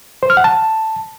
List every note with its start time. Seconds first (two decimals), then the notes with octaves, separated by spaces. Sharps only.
0.23 C5
0.30 F6
0.37 F#5
0.44 A5